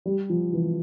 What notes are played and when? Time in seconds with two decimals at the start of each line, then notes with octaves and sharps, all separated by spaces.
0.06 G3
0.30 F3
0.53 E3